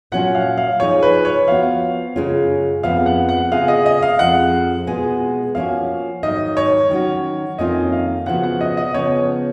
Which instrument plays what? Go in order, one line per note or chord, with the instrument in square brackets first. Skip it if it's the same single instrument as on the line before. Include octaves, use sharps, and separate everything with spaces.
[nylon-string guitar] A#2 F#3 C#4 F4 [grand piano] F#5
[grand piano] F5
F5
[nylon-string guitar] F3 G#3 D#4 G#4 [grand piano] C#5
[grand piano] B4
C#5
[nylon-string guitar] F3 B3 F#4 [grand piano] F5
[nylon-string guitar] F#2 C#3 G#3 C#4 F4
[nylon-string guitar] F2 F3 G#3 B3 [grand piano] F5
[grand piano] F#5
F#5
[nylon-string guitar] C#3 G#3 B3 F4 G#4 [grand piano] F5
[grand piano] D#5
D#5
F5
[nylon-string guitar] F2 F3 G#3 [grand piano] F#5
[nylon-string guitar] B2 G#3 B3 F4 G#4
[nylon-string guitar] F3 A#3 C#4 F#4 [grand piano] F5
[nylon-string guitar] G#2 D#3 F#3 [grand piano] D#5
[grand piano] C#5
[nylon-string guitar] D#3 F#3 C#4 F#4
[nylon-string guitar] F2 D#3 A#3 C#4 F4 [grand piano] D#5
[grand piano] F5
[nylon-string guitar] C#3 F3 B3 F#4 [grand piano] F#5
[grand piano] F#5
D#5
D#5
[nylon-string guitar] C#3 F3 B3 [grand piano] C#5